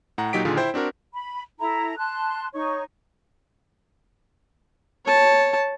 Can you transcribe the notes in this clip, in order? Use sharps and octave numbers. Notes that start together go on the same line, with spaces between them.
A2 F#5 A#5
A#2 F#3 D#4 G4 B6 D7
A#2 D3 D#3 F4 G#4
E4 C5 G5
C4 D4 F#4 A#4
B5
E4 A4 A#5
A5 C6 F#6
D#4 C#5 C#6
C#5 A5